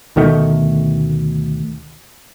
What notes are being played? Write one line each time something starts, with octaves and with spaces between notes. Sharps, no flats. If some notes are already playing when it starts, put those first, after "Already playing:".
D2 B2 D#3 A3